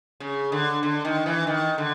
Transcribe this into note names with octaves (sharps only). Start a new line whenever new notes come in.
C#3
D3
D3
D#3
E3
D#3
D3